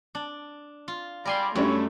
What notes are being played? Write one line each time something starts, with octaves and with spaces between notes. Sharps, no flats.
D4
F4
G3 A#4 D5 G#5 C6
F#2 G3 A3 C#4 D4 E4 C#5